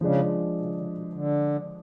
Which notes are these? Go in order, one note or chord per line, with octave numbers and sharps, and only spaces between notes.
C#3 F3 G#3 D4
B2
C#3
D3
C#3
B2
D3